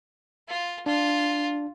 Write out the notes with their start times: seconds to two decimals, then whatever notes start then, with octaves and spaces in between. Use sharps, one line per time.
0.48 F4
0.86 D4 F4